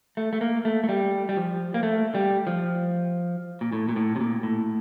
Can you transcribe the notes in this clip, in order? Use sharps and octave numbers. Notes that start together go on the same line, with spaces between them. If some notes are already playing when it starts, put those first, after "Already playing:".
A3
A3
A#3
A3
A3
G3
G3
F3
A#3
A3
G3
F3
A#2
A2
A#2
A2
C3
A#2
A2